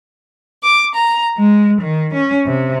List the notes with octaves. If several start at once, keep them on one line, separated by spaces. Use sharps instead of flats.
D6
A#5
G#3
D#3
C#4
C3